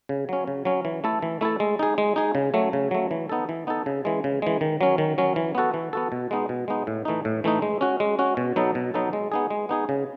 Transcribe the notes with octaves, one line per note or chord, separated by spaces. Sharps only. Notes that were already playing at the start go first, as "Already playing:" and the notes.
C#3
F#3 C#4
C#3
F#3 C#4
E3
A3 E4 A4
E3
A3 E4 A4
G#3
D#4 G#4
G#3
D#4 G#4
C#3
F#3 A3
C#3
F#3 A3
E3
B3 D#4 A4
E3
B3 D#4 A4
C#3
E3 G#3
C#3
E3 G#3
D#3
F#3 C#4
D#3
F#3 C#4
E3
B3 F#4 A4
E3
B3 F#4 A4
B2
G#3 B3 D#4
B2
G#3 B3 D#4
A2
E3 A3 D#4
A2
E3 A3 D#4
G#3
C#4 F#4
G#3
C#4 F#4
B2
F#3 B3 D#4 A4
B2
F#3 B3 D#4 A4
G#3
B3 D#4 G#4
G#3
B3 D#4 G#4
C#3